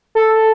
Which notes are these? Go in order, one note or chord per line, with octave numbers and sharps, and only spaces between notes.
A4